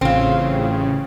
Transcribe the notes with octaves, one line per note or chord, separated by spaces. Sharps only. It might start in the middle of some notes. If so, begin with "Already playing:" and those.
A1 C#3 C4 F4